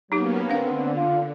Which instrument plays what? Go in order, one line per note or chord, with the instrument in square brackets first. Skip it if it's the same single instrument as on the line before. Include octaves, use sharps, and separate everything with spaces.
[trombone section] F#3 [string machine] A#3 B3 C#4 [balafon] D#4 G4
[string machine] D3 [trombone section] B3 C4 [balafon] D4 F5
[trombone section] F4